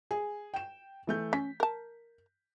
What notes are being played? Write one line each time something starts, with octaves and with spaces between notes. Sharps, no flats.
G#4
G5 E7
E3 A3 G6
C#4 B6
A#4 A5